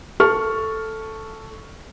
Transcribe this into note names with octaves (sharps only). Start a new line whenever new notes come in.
A4 C#6 F6